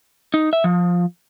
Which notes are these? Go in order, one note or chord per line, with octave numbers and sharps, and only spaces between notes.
D#4
E5
F3